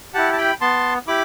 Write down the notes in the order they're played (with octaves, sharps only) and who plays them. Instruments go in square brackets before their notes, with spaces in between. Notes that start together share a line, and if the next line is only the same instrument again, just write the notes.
[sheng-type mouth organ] E4 G4 F#5 A5
A5
G5 B5
B3 A5 C6
E4 G4 B5 D6